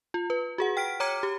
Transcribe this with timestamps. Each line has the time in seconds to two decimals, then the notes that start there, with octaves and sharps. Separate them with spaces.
0.14 F4
0.30 B4
0.58 F#4 G#4 F#5
0.77 G5 F6 B6 D7
1.00 C#5 A#5 D6 F6 G#6 C#7
1.23 G4